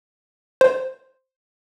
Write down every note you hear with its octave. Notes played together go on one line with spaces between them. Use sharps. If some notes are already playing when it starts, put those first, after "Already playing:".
C5